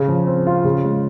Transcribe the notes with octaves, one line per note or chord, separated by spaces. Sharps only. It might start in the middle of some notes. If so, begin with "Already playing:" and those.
Already playing: C#3
F3
C4
F4
C#3
G#3